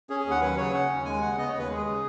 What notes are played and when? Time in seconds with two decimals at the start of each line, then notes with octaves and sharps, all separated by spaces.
0.10 C#4 G#4
0.20 G#4
0.26 D#2
0.31 F#5
0.41 F#3 B4
0.58 C#3 C#5
0.73 C#4 F#5
0.90 D#2
1.05 G#3 G#5
1.22 C#3 F#5
1.38 B3 D#5
1.49 C#5
1.54 D#2 B4
1.70 G#3 G#4
1.86 C#3 G#4